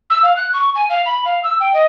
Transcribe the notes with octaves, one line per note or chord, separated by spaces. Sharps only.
E6
F5
F#6
C#6
G#5
F5
B5
F5
E6
G5
D#5